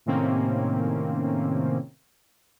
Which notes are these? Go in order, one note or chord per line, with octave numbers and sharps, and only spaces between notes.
A2 C3 D#3 A#3 C4 C#4